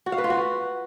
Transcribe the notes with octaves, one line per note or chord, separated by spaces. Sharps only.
F#4
F5
B4
F4
F#4